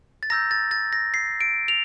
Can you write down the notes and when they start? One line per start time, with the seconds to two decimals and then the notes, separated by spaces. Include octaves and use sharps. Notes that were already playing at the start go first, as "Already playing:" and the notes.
0.23 A6
0.30 A#5 E6 G6 A#6
0.51 A6
0.71 A6
0.93 A#6
1.14 C7
1.41 D7
1.68 F7